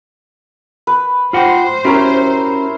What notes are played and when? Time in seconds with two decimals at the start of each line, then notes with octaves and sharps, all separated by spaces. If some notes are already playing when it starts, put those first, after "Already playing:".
0.87 B4
1.33 F4 C5 F#5 G5
1.85 C#4 E4 F#4 G4 A#4 C#5